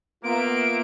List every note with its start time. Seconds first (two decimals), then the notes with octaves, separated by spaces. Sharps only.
0.24 A#3 B3 F4 E5 D7